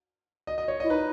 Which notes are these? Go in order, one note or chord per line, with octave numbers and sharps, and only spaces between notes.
D#5
D#5
C#5
E4 D#5
D#4 B4